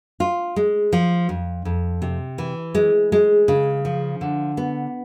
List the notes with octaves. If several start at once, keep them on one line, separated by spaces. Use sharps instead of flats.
F4
G#3
F3
F2
F2
C3
E3
G#3
G#3
C#3
F3
D3
B3